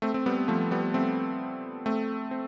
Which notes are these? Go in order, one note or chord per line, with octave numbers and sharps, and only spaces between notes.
A3 C4
C4
G3 B3
F3 A3
G3 B3
A3 C4
A3 C4
C4